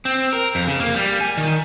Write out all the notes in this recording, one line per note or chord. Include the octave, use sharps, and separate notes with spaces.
C4
A#4
F2
C#3
A#3
G3
G#5
D#3